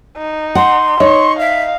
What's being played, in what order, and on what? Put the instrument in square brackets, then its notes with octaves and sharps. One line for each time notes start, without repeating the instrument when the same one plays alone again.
[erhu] D#4
[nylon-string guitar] F#5 [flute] C6
[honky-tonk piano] D#4 [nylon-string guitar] C#5 [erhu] C#6
[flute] E5 [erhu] F5